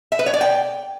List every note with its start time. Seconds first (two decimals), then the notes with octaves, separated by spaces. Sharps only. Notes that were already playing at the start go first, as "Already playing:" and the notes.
0.12 E5
0.19 B4
0.26 C#5
0.34 D5
0.41 G5